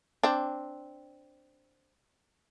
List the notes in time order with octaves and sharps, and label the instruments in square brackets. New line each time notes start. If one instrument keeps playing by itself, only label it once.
[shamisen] C4 D4